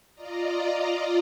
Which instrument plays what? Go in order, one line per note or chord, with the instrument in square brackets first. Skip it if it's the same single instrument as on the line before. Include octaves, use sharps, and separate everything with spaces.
[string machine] F4 D5 D#5 A#5